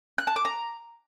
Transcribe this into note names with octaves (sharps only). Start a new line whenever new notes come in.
F#6
A5
D6
A#5